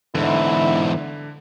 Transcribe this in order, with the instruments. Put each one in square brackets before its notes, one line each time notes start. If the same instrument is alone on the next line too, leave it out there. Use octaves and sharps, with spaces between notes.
[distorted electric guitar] E2 G#2 [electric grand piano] D3 [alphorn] E4